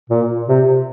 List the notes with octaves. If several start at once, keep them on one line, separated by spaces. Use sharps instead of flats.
A#2
C3